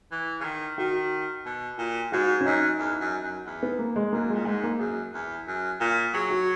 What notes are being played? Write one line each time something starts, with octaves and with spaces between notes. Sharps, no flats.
E3
C#3
D#3
D#3 F#4
B2
A#2
G#2 F#4
C#4
F#2 D#4
E2
F#2
F#2
E2
B3
A#3
G#3
F#2 A#3
A#2 G#3
G#2 G#3
A#3
F#2 G#4
E2
F#2
A#2
F#3 G#4
F#4